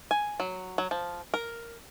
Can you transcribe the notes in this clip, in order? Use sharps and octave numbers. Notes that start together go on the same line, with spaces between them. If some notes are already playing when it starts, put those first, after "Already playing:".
G#5
F#3
F#3
F3
A#4